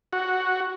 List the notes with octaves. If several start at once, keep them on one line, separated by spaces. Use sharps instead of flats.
F#4